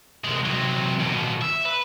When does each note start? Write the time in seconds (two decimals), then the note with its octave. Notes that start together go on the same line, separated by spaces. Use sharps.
0.24 C2 G#3
0.46 C3 F#3
1.00 D#2 B2
1.41 E5
1.65 B4